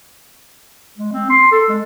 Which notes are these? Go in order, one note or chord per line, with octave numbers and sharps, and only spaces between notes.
G#3
C4
C6
A4
G#3